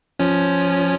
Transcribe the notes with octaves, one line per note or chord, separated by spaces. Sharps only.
F3 C#4